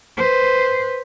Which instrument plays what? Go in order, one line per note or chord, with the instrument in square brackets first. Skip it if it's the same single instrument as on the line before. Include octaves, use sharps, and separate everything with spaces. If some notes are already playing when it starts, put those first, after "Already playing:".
[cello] B4 C5